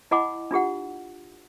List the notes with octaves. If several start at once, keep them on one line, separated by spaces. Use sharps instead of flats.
E4 D#5 F#5 G#5 B5 D6
D4 F4 G4 F#5